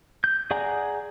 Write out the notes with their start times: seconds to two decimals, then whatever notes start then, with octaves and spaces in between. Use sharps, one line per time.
0.24 G6
0.51 G#4 D5 F#5 G#5 A#5